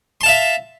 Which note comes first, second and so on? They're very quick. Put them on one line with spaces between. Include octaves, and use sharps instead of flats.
C6 A5 F5 E5